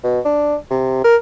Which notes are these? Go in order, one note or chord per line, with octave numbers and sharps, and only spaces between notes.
B2
D4
C3
A#4